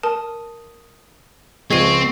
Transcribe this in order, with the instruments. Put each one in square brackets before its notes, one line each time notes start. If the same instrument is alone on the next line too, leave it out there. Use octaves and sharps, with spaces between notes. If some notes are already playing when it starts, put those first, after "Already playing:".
[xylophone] A#4 A5 [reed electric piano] D#6
[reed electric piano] C#2 F3 G#3 [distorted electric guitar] C4 [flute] C#6 [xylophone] G#6 C7 D#7